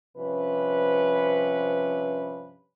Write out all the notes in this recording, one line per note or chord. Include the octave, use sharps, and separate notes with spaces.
G2 C3 F3 C#4 B4